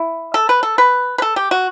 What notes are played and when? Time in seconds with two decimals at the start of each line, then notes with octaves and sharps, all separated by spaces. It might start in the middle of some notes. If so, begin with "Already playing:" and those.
Already playing: E4
0.34 A4
0.49 B4
0.63 A4
0.78 B4
1.18 B4
1.22 A4
1.36 G4
1.51 F#4